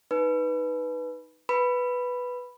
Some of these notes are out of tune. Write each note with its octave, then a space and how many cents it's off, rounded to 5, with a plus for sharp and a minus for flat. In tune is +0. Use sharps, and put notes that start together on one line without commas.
D#4 +5 B4 +0
B4 +0 B5 +0